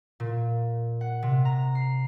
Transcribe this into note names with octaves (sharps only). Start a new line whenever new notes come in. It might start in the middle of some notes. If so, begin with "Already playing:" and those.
A#2
F#5
C3
A#5
C7